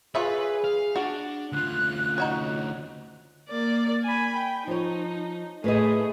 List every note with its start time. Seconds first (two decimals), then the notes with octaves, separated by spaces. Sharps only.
0.15 F4 G#4 B4 C#5 E5 B5
0.64 F5
0.96 D4 F#4
1.52 D2 F4 F#6
2.18 D#4 F#4 C#5
3.49 A#3 D5
4.03 G#5 B5
4.35 G5
4.67 F3 D#4 C#5
5.64 A2 A3 G#4 B4 D#5